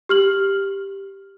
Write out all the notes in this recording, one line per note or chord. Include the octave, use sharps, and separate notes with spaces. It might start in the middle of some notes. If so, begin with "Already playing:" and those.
G4 F6 F#7